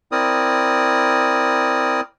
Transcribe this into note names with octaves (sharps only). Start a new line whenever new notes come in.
C4 E4 A#4 D5 D#6